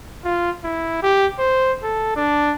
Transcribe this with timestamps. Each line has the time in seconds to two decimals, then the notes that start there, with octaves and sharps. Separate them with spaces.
0.24 F4
0.64 E4
1.02 G4
1.39 C5
1.83 A4
2.16 D4